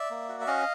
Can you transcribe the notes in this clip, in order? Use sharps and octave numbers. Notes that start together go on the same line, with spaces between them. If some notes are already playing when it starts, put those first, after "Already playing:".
Already playing: D5 E5
A#3
F#4
E5
C#4 D#5 F5